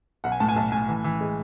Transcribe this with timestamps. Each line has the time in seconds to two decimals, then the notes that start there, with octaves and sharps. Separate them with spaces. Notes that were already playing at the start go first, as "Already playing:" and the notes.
0.24 B1 F#5
0.32 G#5
0.40 A2 A5
0.48 G#5
0.56 B1 A5
0.72 A2 G#5
0.89 E3
1.04 E3
1.21 G#3